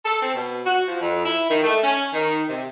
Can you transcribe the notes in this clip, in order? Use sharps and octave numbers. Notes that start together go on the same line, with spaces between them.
A4
C4
B2
F#4
F3
F2
E4
D#3
A3
C#4
D#3
C3